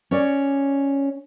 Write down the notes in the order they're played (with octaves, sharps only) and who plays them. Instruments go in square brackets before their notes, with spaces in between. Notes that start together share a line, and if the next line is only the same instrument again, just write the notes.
[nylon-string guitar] C#4 C#5 D5